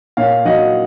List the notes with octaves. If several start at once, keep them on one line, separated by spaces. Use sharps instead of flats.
A#2 C#5 F5
F#3 D#5 F#5